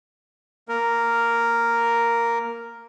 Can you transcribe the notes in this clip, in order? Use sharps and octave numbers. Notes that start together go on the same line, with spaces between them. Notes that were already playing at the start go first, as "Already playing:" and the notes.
A#3 A#4